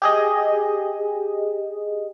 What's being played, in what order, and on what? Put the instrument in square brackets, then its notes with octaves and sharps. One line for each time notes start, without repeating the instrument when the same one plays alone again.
[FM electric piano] G4 G#4 D#5